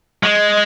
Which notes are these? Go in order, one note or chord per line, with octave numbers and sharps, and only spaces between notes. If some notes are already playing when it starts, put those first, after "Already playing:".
G#3